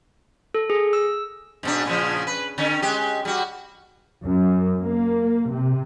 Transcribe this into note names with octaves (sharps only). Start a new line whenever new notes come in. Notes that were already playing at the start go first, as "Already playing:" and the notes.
A4
G#4
E6
G#2 B2 D4
A#2 C#3 F3
B4
D3 C#4
G#3 G4
G3 F#4
F#2
A#3
C3